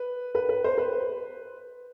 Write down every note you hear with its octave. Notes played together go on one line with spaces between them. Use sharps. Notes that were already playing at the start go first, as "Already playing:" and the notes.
Already playing: B4
B4
B4
C5
B4